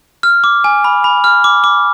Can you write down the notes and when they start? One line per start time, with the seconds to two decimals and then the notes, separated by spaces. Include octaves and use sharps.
0.23 F6
0.44 D6
0.64 G#5
0.84 B5
1.04 B5
1.24 F6
1.44 D6
1.64 D6